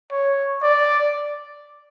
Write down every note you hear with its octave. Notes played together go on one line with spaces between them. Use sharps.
C#5
D5